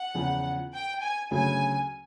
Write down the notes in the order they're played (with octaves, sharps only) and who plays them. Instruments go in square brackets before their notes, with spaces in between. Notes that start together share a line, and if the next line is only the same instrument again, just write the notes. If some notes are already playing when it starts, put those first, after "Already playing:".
Already playing: [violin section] F#5
[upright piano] E2 C#3 F3
[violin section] G5
G#5
[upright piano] D2 C#3 F#3 [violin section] G#5